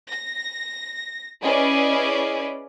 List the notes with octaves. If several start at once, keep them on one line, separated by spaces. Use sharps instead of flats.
A#6
C#4 E4 G#4 B4 D5 D#5